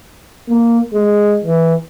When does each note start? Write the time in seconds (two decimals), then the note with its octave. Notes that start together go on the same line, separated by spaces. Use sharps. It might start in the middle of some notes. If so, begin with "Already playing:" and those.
0.49 A#3
0.93 G#3
1.44 E3